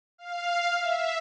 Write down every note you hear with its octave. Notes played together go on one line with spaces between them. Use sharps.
F5
E5